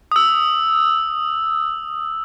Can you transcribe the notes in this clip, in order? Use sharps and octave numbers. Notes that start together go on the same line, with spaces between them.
D#6 E6